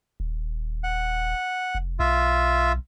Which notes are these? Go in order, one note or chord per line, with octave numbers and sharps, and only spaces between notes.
D#1
F#5
F1
B1 F4 E5